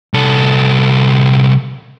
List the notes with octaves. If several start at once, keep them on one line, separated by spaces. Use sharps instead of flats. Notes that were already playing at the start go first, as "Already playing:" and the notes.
C2 A4